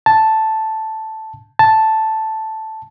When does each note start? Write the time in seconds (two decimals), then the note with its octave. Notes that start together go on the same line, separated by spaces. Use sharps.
0.06 A5
1.59 A5